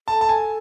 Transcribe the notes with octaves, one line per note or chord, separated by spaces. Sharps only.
A4 A5
A5
G#5